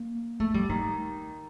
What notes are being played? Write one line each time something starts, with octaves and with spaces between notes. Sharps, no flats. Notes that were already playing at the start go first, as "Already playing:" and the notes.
Already playing: A#3
A3
G3
D#3